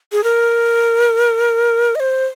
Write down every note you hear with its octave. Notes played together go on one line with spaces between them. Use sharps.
G#4
A#4
D#5
C5